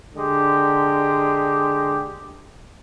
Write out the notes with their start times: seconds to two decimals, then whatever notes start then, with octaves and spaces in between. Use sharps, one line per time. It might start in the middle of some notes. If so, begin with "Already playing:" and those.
0.15 D3 G#3 G4